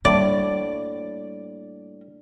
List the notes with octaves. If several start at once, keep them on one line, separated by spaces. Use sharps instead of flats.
A2 G3 A#3 D4 F#4 D5 B5